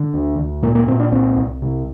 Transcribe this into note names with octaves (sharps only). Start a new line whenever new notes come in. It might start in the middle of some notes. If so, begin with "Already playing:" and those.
Already playing: D3
D2
D2
A#2 A#3
A#3
A#2 C4
D4
C2 C4
C2
C3